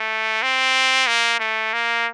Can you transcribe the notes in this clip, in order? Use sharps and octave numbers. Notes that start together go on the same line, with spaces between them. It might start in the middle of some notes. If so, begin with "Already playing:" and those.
Already playing: A3
C4
A#3
A3
A#3